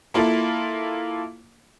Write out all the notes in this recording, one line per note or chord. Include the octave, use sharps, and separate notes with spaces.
A#3 E4 F4 A4